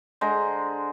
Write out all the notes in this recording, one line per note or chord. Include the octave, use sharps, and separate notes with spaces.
D3 G#3 C5 A#5